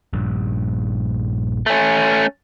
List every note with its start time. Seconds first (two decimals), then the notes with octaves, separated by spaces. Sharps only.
0.13 A#1 G2
1.66 A3 C#4